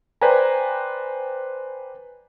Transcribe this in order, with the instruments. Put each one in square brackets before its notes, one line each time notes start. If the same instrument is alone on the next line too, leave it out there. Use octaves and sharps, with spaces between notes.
[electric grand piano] B4 C5 D5 G5 G#5 A#5